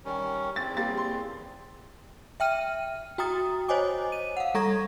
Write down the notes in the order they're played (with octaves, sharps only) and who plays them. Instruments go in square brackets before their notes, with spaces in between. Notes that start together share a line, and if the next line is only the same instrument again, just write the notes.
[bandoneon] D#3 G3 C#4
[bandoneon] E2 C4 [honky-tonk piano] A6
[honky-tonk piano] G3 A#3 A6
C6
[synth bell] E5 G5 F6 D#7
F#4 G5 A#5 D#6 A6
C5 C#5 D#5 G#5 D6
D#7
F5 F#5
G3 A4 A#5 C#6 G#6 A#6